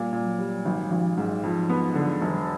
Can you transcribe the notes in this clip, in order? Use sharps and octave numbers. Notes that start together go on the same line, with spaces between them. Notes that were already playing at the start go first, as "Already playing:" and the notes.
Already playing: A#2 G3
A#2
F#3
G3
G#1 F#3
G#1 F3
G#2 F#3
F2
B3
D3
E1